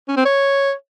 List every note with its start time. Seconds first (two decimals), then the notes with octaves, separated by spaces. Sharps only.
0.08 C#4
0.17 C4
0.25 C#5